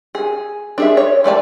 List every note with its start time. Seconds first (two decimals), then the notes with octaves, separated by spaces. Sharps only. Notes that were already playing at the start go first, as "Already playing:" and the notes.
0.15 G#4
0.78 D4 G#4 E5
0.97 C#5
1.24 E3 A3 D5 A5